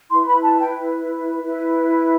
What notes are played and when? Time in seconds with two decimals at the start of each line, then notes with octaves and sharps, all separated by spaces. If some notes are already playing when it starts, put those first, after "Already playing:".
0.10 E4 B4 C6
0.27 B5
0.43 A5
0.59 G5
1.42 E4 B4